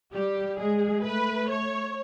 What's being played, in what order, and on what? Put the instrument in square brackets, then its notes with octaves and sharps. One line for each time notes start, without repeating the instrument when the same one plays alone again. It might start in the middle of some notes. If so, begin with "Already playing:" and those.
[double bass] G3 [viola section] G4
[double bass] G#3 [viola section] G#4
[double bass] A3 [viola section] B4
[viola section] C#5